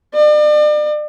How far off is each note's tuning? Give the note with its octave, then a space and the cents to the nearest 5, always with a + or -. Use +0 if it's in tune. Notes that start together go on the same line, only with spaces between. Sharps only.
D5 +40